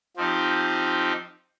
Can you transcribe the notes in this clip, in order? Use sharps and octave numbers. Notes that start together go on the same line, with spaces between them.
F3 C4 D#4 G4